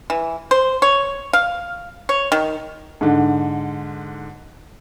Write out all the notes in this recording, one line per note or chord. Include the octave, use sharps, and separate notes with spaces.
E3
C5
C#5
F5
C#5
D#3
G#2 D3